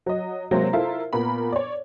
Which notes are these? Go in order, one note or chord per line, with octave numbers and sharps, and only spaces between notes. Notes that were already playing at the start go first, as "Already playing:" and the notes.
F#3 D#5
C3 F#3 G#3 A#3 C4
E4 F4 A4 A#4 C5 E5
A#2 B3 A#4 B5
C#5 D5